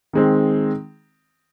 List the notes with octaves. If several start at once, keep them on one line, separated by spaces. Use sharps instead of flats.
D#3 G#3 C4